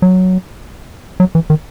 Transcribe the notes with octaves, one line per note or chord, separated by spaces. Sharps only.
F#3
F#3
E3
D#3